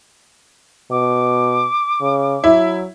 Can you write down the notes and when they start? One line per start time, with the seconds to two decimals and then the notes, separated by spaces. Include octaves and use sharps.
0.91 B2 D6
2.01 C#3
2.44 F#3 E4